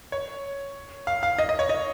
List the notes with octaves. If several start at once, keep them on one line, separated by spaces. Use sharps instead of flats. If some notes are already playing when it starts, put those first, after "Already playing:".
C#5
F5
F5
D#5
D#5
C#5
D#5